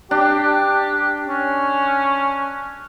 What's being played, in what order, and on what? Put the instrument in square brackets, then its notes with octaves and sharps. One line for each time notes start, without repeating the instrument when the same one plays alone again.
[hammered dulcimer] D4 [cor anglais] G4
[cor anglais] C#4